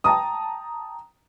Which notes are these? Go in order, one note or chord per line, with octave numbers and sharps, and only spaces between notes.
G5 A5 A#5 D#6